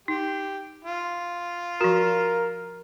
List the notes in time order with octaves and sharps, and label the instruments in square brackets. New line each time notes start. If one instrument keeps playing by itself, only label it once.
[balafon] D#4 [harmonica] G4
[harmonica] F4
[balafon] F3 F#4 [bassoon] A#4